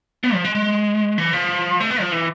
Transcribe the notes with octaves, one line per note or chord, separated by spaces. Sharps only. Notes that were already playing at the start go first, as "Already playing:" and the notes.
B3
F3
G#3
G#3
E3
F3
A3
B3
F3
E3